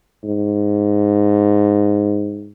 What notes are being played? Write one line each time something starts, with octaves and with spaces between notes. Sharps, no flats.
G#2